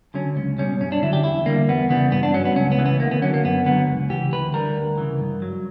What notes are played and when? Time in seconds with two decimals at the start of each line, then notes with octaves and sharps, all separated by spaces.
0.14 D3 F#3 C#4
0.36 C#2 C#4
0.58 B2 G3 C#4
0.80 F#2 C#4
0.92 D4
1.02 D3 F#3 E4
1.13 G4
1.24 E2 E4
1.46 D3 G3 A#3
1.69 E2 B3
1.90 C#3 E3 G3 B3
2.12 G2 B3
2.23 D4
2.34 F#3 C#4
2.45 B3
2.56 C#2 C#4
2.72 B3
2.78 C#3 E3
2.86 B3
3.00 D2 A#3
3.11 B3
3.22 D3 F#3 C#4
3.34 A#3
3.44 F#2 B3
3.66 D3 F#3 B3
3.88 C#2
4.10 C#3 E3 G4
4.32 D2 B4
4.54 D3 G3 A#4
4.76 D2
4.98 C#3 E3
5.20 G2
5.42 F#3